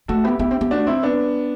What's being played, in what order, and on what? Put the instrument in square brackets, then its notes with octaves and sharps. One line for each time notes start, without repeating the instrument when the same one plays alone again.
[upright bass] A3 [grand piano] F#4 A4
[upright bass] B3 [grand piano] E4 G4
[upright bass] B3 [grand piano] E4 G4
[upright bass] C4
[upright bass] B3 [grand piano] G4
[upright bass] A3 [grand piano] D4 F#4
[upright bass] F#3 [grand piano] C4 E4
[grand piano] B3 D4